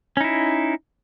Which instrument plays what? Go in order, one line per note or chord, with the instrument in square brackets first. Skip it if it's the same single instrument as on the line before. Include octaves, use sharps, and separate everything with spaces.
[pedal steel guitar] C#4
D#4
E4